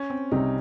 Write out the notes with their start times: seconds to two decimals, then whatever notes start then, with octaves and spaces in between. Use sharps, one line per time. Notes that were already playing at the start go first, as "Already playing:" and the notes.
Already playing: C#4
0.10 C4
0.31 C2 C3 G3 D#4